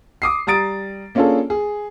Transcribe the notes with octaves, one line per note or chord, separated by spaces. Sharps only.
D6 D#6 C7
G3 A#5 D#6 A6 D7
A#3 C#4 D4 F4 G#4 A4
G#4